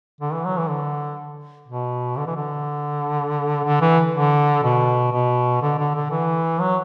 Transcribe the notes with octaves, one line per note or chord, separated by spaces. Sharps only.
D3
E3
F#3
E3
D3
B2
D3
E3
D3
D3
E3
D3
B2
B2
D3
D3
D3
E3
F#3